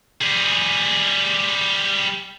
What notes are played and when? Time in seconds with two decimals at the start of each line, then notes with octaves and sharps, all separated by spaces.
0.22 G3 G#4